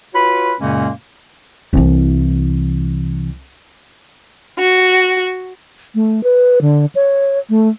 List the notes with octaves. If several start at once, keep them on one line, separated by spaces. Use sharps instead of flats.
F4 F#4 B4 C#5 B5
F#2 A#2 C#3 G#3 A#3 C#4
C2 E3
F#4
A3
B4
D3
C#5
A3